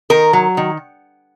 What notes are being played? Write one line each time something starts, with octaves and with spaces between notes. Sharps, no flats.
D#3 A#4
F#3
D#3